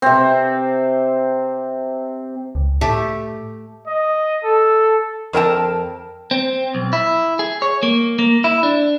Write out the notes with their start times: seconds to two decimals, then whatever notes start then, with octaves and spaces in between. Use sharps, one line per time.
0.02 C3 C4
2.55 C#2
2.81 A2 A3 G4
3.87 D#5
4.44 A4
5.33 F2 A#4 G5 A5
6.31 C4
6.75 B1
6.93 E4
7.39 G#4
7.62 C#5
7.83 A#3
8.19 A#3
8.44 E4
8.63 D4